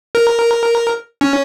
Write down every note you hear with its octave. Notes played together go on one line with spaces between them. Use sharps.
A#4
C#4